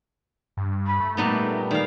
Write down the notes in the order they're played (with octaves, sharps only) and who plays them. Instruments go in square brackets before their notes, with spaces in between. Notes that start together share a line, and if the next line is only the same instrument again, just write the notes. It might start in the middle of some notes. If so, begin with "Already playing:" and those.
[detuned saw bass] G2
[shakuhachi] B5
[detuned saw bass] A3
[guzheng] A#2 G3 B3 [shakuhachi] D#4
[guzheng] D#3 F5 [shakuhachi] D5